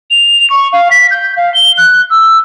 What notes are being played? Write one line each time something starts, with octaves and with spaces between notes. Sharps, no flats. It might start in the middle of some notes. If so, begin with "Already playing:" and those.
F7
C#6
F5
B6
G6
F5
G7
F#6
E6